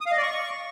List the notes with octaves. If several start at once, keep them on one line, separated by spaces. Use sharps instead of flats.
D#6
F5
D#5
D5
C#6